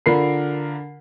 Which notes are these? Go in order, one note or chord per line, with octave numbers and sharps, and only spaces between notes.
D3 F4 A#4 B5 C7